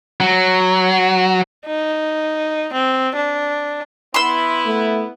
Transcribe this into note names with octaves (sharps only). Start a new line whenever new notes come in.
F#3
D#4
C4
D4
B3 E4 B5 C6 E6
A3